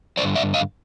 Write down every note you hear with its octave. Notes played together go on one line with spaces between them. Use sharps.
G2 D3 G3 C5 D5
D5 E5
D#5 F5